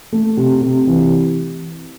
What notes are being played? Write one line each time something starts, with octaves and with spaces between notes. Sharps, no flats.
A3
C3
C3
E3